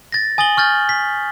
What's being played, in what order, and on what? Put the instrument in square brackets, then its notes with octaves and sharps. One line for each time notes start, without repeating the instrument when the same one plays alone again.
[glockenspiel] A6 A#6
G#5 D#6 A6 F#7 G7
C#6 F6 G6 A6
B6